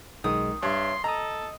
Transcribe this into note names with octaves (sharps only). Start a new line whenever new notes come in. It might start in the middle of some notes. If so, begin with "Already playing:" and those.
B1 D#3 G#3 D#6
G2 C#5 E5 C6
A4 D#5 A#5 D#6